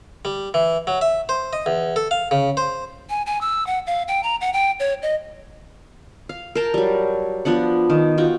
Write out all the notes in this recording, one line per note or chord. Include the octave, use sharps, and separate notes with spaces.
G3
E3
F#3
E5
C5
D#5
E2
A4
F5
C#3
C5
G#5
G#5
E6
F#5
F5
G5
A#5
F#5
G5
C#5
D#5
F5
A#4 F5 G5 A5
F#3 G3
F3 B3 D4 F#5
D#3
F4 F#4 G5